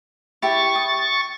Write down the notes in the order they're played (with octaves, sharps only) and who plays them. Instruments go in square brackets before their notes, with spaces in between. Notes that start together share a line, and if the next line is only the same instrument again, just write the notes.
[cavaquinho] E4 G4 [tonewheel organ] C#6 A6
[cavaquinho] D#6